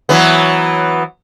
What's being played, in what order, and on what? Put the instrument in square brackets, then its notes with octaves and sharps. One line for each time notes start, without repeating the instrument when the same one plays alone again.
[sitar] E3 F#3 B3